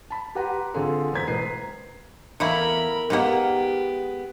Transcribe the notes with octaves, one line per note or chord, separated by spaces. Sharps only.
A5 B5
G4 B4 F#5 A#5 C6
D3 C4 D4 F4 G#4 A4
E2 A#4 C5 A#5 G#6 B6
E1 B4 C5 C7
A#5
E2 A3 A#3 E4 A#4 B5
D#3 G#3 A#3 B3 G4